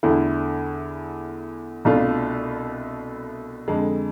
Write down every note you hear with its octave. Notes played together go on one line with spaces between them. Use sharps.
E2 D3 A3 E4
C2 B2 A3 D4 F4
F2 D3 G#3